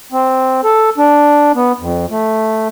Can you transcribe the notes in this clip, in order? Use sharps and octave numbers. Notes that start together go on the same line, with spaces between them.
C4
A4
D4
B3
F2
A3